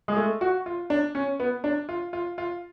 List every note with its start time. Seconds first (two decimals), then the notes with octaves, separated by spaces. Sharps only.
0.08 G#3
0.16 A3
0.41 F#4
0.66 F4
0.90 D4
1.15 C#4
1.39 B3
1.64 D4
1.89 F4
2.13 F4
2.38 F4